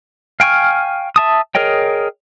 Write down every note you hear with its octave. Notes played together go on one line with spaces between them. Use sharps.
F5 G5 G#5 C#6 F6
E5 A5 D#6
G#4 A#4 C#5 D#5 G5